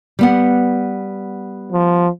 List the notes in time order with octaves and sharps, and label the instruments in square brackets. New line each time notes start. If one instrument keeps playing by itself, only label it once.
[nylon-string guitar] G3 B3 F#5
[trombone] F3